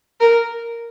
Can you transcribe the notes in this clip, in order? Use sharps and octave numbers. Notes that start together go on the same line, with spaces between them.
A#4